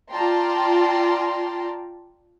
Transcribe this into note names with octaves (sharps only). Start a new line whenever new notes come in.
F4 D5 G5 A5 A#5 C6